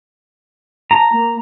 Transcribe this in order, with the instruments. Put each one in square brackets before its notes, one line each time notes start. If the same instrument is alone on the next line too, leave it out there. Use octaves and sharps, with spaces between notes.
[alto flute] A5 [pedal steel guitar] A#5
[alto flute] A#3